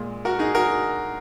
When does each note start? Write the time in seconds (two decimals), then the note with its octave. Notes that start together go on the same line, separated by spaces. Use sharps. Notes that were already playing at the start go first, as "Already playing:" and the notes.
Already playing: A#2 G#3
0.25 F#4 A#4
0.39 D#4 G#4
0.55 F#4 A#4